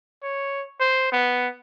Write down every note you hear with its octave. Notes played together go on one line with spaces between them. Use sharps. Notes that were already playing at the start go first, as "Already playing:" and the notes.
C#5
C5
B3